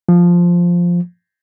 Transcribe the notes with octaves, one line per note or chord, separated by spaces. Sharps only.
F3